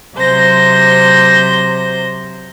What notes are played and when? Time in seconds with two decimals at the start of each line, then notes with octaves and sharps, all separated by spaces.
0.17 C3 F#3 C5 G6 A#6